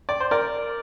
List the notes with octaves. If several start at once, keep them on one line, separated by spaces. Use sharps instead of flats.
D5
C5
A#4 D5